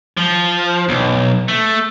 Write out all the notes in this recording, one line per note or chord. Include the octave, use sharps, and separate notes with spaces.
F3
B1
A3